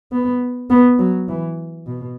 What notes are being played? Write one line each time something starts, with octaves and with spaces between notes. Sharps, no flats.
B3
B3
F#3
E3
B2